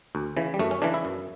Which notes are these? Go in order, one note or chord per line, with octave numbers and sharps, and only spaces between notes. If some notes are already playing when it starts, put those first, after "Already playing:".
D2
C#3 E3
G3
F#2 A3
C#4
C#3 E3 D4
E4
F#2